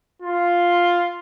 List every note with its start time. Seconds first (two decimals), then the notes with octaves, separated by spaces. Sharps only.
0.22 F4